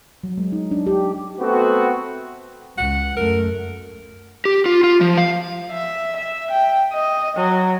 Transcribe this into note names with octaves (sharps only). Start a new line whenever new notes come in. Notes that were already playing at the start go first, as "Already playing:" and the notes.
F#3
G#3
D#4
D4
G4
A3 B3 C4 F#4
C#2 F#5
F#2 A3 A#4
G4
F4
F4
F3
F5
E5
E5
G5
D#5
F#3